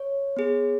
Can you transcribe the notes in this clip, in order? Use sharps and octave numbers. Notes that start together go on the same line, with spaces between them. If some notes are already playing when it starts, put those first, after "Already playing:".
Already playing: C#5
B3 G#4